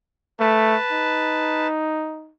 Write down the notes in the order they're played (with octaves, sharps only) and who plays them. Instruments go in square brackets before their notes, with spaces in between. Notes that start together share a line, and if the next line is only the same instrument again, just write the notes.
[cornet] A3 [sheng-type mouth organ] B4 A5
[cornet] D#4